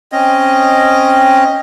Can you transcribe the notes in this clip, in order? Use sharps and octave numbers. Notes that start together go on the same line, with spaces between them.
C4 C#4 D#5